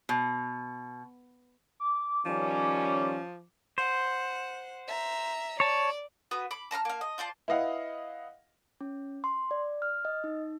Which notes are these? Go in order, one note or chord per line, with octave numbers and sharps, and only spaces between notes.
B2
D6
D#3 F3 G3 C#4
C5 F#5
E5 A#5
C#5 D5 A5
B3 F#4 B4 D#6
B5 D6
A5 A#5 C6 F6
A#3 F5
D#5
F4 C5 D5 A5
E4 B4 D#5 F5 F#5
C#4
C6
D5
F6
D#5
D#4